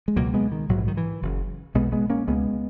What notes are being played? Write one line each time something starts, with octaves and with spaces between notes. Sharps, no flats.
G#3
C#2 B2 F#3 A#3
G#3 B3
D#3
A#1 G#2 F#3
E3
D#3
E3
F#1 F#2 C#3
B1 B2 G#3 B3
G#3 B3
A#3 C#4
C#2 B2 G#3 B3